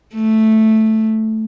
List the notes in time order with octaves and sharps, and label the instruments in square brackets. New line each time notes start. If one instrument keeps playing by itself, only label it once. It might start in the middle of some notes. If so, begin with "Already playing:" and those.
[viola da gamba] A3